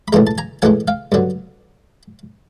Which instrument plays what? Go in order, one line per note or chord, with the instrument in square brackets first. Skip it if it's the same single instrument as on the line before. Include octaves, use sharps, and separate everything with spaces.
[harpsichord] B5
A#1 A2 E3 G#3 A#5 C6
A5
G#5 A#5
A#1 A2 E3 G#3 F#5 G#5
F5 G5
G2 D3 F#3